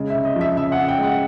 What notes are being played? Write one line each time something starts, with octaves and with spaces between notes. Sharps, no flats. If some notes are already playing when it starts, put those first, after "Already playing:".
Already playing: C#3 G#3
E5
C#3
D#5
F3
E5
C#3 E5
F#5
C#3
G5
G#3 F#5